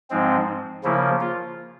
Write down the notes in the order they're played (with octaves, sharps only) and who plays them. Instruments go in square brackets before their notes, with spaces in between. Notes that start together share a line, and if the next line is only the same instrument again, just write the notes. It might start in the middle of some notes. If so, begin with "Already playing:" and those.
[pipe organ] G#2 F3 G#3 C4
C#3 F3 A#3 E4
F4